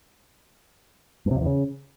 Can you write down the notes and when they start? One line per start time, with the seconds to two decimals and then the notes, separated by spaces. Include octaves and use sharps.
1.26 G2
1.31 C3
1.36 F2
1.41 E2
1.46 C#3